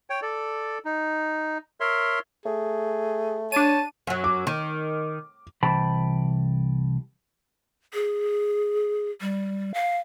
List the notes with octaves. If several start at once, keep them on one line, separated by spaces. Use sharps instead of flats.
C#5 G5
A4 D5
D#4
A#4 C#5 E5 C6
A3 G#4
D4 C#5 A5 D#7
F#2 F#3
D6
D#3
C2 E3 C5 G5 A5 B5
G#4
G3
F5